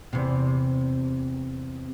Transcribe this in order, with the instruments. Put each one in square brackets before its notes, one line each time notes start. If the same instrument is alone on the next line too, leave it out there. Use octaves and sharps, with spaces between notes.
[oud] E2 C3